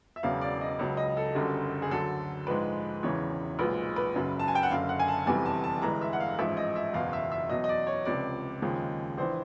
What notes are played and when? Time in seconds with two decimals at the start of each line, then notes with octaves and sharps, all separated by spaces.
0.16 E5
0.23 E1 E2 C#3 F#3 F5
0.41 D5
0.61 D#5
0.79 C#2 C#3 F#3
0.97 D#5
1.17 A4
1.35 F#1 F#2 D3 G3
1.82 G#4
1.91 D2 D3 F#3 A4
2.47 A#1 G#2 F3 G#3 B4
3.03 E1 E2 C#3 E3 C#5
3.59 B1 A#2 F3 G#3 B4
3.96 B4
4.14 F#1 F#2 C#3 F#3
4.39 A5
4.48 G#5
4.55 G5
4.63 F#5
4.71 F#1 F#2 D3 F5
4.89 F#5
5.00 G#5
5.08 A5
5.26 F1 E2 C3 E3 G3 G#5
5.46 A5
5.64 A5
5.82 G1 G2 E3 G#3 A#5
6.01 E5
6.13 F#5
6.20 F5
6.38 A1 G#2 F3 G#3 E5
6.57 D#5
6.76 E5
6.94 F#1 E2 B2 F5
7.13 E5
7.32 E5
7.49 E2 B2 F#3 D#5
7.64 D#5
7.69 D5
7.87 C#5
8.05 C#2 C3 F3 D5
8.62 D#2 C#3 F3 G#3
9.18 A#1 E3 C5